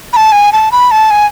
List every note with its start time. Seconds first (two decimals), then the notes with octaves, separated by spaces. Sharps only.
0.13 B5
0.17 A5
0.32 G#5
0.52 A5
0.72 B5
0.91 A5
1.11 G#5